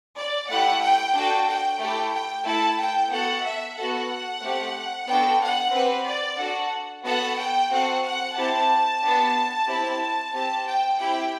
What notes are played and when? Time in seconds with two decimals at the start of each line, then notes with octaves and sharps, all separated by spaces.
0.17 D5
0.50 A3 E4 G4 F#5
0.82 G5
1.15 D4 F#4 A4 G5
1.48 G5
1.80 A3 E4 G4 G5
2.13 G5
2.46 A3 E4 A4 A5
2.79 G5
3.12 B3 F#4 A4 F#5
3.45 E5
3.77 B3 F#4 A4 F#5
4.43 A3 C4 G4
5.09 B3 D4 F#4 A4 G5
5.41 F#5
5.74 C4 G4 B4
6.07 D5
6.39 D4 F#4 A4 F#5
7.05 B3 F#4 A4 F#5
7.39 G5
7.71 C4 F#4 A4 F#5
8.04 F#5
8.37 C4 E4 G4 A5
9.02 B3 D4 G4
9.68 C4 E4 G4
10.33 C4 G4 A5
10.66 G5
10.99 C4 E4 G4 G5